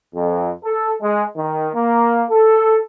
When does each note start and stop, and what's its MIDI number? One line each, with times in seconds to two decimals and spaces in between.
0.15 0.52 41
0.64 0.93 69
1.02 1.25 56
1.36 1.68 51
1.75 2.24 58
2.31 2.79 69